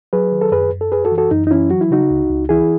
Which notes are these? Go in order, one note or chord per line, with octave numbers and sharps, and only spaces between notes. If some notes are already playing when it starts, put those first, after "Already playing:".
F#3 G#4 B4
D#3
A4
F#2 G#4 B4
F#2
A4
F#2 G#4 B4
F#4 A4
E3
F#4 A4
F#2 D#4
D#4
E3 C#4 E4
F#3 F#4
E4
C#3 D#4 F#4
C#2
C#2
E3 E4 G#4